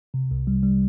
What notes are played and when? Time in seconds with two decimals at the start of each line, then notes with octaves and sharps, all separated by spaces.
0.14 C3
0.31 C2
0.47 G3
0.63 G3